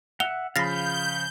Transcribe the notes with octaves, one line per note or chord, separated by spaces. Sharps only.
E5 F#5 F7 G7
C#3 F3 F5 B5 G6 A6 A#6 C7